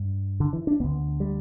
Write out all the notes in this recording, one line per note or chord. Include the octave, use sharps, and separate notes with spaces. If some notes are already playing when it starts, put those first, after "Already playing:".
Already playing: G2
D3
E3
D4
D2 D3 B3
G3